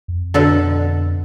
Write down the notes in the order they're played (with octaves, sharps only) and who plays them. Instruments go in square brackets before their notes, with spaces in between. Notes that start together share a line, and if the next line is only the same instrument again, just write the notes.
[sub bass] F2
[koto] B2 D3 A4